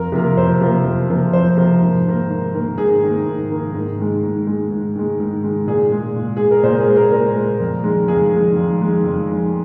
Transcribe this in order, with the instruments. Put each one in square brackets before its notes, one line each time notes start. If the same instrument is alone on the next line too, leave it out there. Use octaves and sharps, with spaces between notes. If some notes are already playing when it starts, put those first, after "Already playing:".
Already playing: [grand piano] F2 A#4
C3 F3 A#3
F2 C5
C3 F3 A#3
F2
C3 F3 A#3
F2 C5
C3 F3 A#3
G#2
D#3 A#3
G#2
D#3 A#3
G#2 G#4
D#3 A#3
G#2
D#3 A#3
G#2
D#3 G#3
G#2
D#3 G#3
G#2
D#3 G#3
G#2
D#3 G#3
A#2 G#4
G#3
A#2
G#3 G#4
A#4
A#2 C5
G#4
G#3
A#4
A#2 A#4
G#3
F2
D#3 G#3
F2 G#4
D#3 G#3
F2
D#3 G#3
F2
D#3 G#3